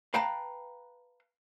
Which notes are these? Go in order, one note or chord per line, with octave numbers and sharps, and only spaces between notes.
B4 F5 G5 A5 A#5